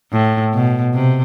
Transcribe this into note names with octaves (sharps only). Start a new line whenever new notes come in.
A2
B2
C3